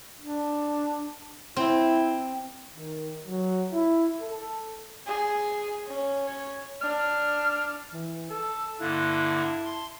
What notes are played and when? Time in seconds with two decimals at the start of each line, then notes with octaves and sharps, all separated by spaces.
0.20 D4
1.56 C4 E4
2.75 D#3
3.27 F#3
3.72 E4
4.22 A4
5.07 G#4
5.87 C#4
6.27 C#5
6.82 D4 F6
7.93 E3
8.30 A4 E6
8.80 G2 D3 A#3 E4 F#6
9.28 A5
9.65 C6